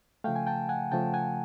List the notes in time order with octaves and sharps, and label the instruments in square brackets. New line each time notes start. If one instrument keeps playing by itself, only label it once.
[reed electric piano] C#3 F3 A3 F5 G5
G#5
G5 A5
F#5 G#5
C#3 F3 A3 G5 A5
F#5 G#5